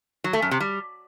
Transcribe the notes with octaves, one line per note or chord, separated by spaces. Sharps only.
F#3
A3
F#2
C3
G3